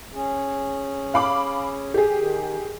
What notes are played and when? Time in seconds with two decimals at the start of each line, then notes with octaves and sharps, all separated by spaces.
0.13 C#4 G#4
1.14 F5 B5 D6
1.94 G4 G#4
2.14 D#3